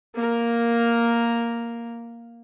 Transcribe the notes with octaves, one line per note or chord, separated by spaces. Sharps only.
A#3 A#4